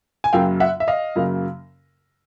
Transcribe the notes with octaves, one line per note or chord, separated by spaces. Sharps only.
G#5
F#2 C#3 F#3 A#3 F5 G5
E5 F#5
E5
D#5 F5
F#2 C#3 F#3 A#3